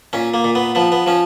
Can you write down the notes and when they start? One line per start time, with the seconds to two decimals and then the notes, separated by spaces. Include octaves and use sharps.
0.13 A#2 C#4
0.34 A#3
0.44 A#2
0.55 B3
0.75 F3 B3
0.92 B3
1.06 F3 C#4